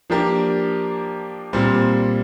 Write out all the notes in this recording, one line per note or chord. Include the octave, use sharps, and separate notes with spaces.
F3 A#3 D4 G4 A#4
A#2 G3 C4